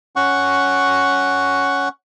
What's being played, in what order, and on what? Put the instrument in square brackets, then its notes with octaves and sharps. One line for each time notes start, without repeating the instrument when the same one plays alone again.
[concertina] C#4 F#5 C#6